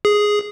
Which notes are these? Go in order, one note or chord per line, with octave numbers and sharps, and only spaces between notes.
G#4